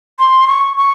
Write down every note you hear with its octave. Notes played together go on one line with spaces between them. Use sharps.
C6
C#6
C#6